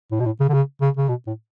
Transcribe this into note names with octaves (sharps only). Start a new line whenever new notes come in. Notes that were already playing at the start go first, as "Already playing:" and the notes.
A2
B2
A2
C#3
D3
C#3
C#3
C#3
B2
A2